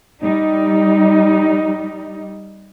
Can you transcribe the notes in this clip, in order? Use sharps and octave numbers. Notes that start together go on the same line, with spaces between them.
G3 D#4